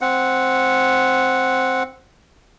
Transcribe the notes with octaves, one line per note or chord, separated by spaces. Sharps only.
C4 F#5